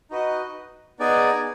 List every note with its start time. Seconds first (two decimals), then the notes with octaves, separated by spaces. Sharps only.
0.11 D#4 F#4 B4 D#5
0.99 B3 D#4 G#4 D5 G#5